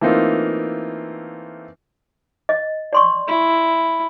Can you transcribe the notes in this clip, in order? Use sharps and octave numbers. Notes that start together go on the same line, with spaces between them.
E3 A3 A#3 C4 D#4 F4
D#5
D5 C6 C#6
E4